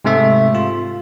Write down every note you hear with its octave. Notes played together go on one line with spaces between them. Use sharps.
G#2 C3 A3 E5
F4